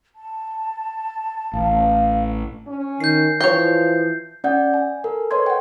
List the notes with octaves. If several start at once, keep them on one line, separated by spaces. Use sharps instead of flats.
A5
A1 F5
C#4
D#3 G6 C7
E3 F3 C#5 G5 G6
C#4 D5 F#5 G6
G#5
A4 A#4
B4 C#5 D#5 C6 G#6
F#5 G5